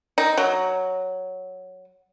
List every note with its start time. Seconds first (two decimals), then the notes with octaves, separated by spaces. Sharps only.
0.18 D#4
0.38 F#3